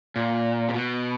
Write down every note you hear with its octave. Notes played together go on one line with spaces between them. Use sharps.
A#2
C3
B2